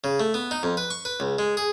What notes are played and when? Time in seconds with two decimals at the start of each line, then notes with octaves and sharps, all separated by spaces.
0.04 C#3
0.20 A3
0.34 B3
0.51 D#4
0.63 F2
0.77 B4
0.90 C#6
1.05 B4
1.20 C#2
1.39 G#3
1.57 G#4